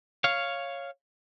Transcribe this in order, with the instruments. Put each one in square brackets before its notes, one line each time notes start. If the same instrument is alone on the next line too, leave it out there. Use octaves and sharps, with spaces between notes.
[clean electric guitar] C#5 F5